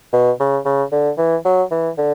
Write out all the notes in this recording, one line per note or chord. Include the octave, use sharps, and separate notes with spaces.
B2
C#3
C#3
D3
E3
F#3
E3
D3